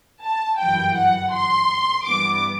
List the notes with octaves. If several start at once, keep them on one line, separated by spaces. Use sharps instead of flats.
A5
G1 F#2 E3 G5
F#5
C6
G2 E3 B3 D6